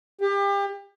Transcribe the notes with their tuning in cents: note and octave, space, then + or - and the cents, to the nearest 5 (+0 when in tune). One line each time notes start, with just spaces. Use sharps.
G4 +30